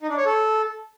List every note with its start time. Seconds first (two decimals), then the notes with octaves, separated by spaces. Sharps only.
0.01 D#4
0.09 D4
0.17 C#5
0.25 A4